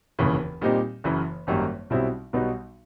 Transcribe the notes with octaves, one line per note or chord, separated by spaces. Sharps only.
F1 D#2 C#3 E3
A#2 G3 C4 D#4 G4
F#1 F#2 C#3 E3
G#1 F#2 D#3 G3 A#3
B1 B2 G3 C4 E4
B1 B2 G3 B3 D#4